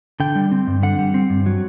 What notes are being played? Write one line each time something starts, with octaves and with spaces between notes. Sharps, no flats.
D3 G5
G3
C4
G2
D3 F#5
G3
C4
G2
F#3